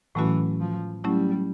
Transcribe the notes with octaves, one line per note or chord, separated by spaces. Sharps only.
A2 E3 F#3 A3 C#4 F#4
F3
F#3 G3 A3 C#4 E4